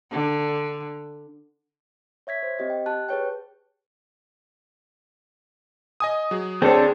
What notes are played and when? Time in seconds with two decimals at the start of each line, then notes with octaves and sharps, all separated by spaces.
0.11 D3
2.27 C#5 E5 G#6 B6
2.43 C5
2.59 C4 G4 D#5
2.70 G5
2.86 G4 A5 F#6
3.09 G#4 B4 C#5 G5
6.00 D#5 G#5 D#6
6.31 F#3 G#4
6.62 D2 C4 D4 G#4 A4 C5 C#5